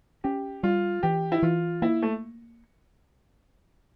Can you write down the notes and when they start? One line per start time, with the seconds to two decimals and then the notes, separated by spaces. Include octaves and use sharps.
0.24 C#4 G4
0.63 G3 F4
1.03 E3 G4
1.32 E4
1.42 E3 F4
1.82 A#3 E4
2.02 A3